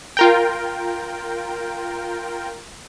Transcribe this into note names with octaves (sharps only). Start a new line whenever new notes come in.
F4 A#4 G5